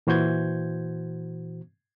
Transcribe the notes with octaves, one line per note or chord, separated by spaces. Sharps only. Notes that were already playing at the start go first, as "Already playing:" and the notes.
A#2 E3 F#4 C5 G6 G#6